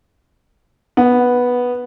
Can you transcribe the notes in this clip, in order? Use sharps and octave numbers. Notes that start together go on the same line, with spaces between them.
B3